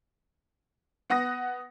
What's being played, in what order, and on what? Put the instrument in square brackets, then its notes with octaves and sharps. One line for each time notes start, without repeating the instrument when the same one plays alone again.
[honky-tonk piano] B3 F#5 D#6 A#6